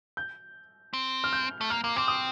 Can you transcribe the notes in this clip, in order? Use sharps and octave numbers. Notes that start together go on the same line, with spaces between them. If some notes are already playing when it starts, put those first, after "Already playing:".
G6
C4
F6
G6
A3
A#3 F6
A#3 D6
C4 D6
D#6